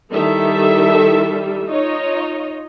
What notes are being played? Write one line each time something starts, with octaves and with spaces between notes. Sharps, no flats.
D#3 G3 E4 A4 E5
D#4 F4 C#5 D#5